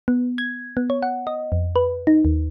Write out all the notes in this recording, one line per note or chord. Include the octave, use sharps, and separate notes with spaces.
B3
G#6
B3
C#5
F#5
D#5
F2
B4
D#4
D#2